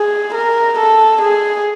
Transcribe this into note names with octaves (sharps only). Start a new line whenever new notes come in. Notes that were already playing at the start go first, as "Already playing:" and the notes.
Already playing: G#4
A#4
A4
G#4